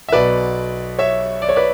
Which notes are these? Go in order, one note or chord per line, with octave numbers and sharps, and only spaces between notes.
E5
B1 B2 B4 D5
C#5 E5
D5
C#5
B4 D5